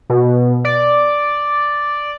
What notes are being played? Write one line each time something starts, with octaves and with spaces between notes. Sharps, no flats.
B2
D5